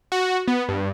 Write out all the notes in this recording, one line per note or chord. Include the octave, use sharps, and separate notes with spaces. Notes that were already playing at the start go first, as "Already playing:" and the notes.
F#4
B3
G2